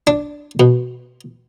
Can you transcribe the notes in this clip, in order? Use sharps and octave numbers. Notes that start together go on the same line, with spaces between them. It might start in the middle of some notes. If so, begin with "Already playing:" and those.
D4
B2